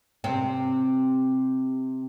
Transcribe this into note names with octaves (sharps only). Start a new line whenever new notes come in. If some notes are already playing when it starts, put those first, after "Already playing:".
C3 C4